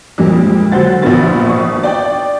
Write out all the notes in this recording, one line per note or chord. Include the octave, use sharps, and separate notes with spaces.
F2 A#2 G3 G#3 A#3
D3 F#3 C5 F#5 A6
A#1 E2 A#2 A#3 B3 A6
G#1 C#6 D#6
D5 G5